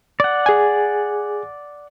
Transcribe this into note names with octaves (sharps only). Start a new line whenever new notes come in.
D5 F#5
G#4 G#5